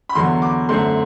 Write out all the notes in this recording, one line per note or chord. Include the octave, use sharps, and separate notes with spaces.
B5
E2 D3 F#3 B3 C6
D6
F#2 D3 A3 C4 C6